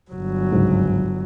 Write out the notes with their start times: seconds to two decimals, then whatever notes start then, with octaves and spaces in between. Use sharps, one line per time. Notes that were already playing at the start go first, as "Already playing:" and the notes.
0.11 G1 F#3
0.52 C#2 G#2